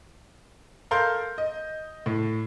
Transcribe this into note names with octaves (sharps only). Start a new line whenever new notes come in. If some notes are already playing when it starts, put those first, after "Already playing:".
A4 A#4 F5 C6 G6
D#5
A2